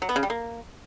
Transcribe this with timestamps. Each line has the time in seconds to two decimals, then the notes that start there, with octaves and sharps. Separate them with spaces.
0.02 F#3
0.09 B3
0.16 C#3
0.23 G3
0.30 A#3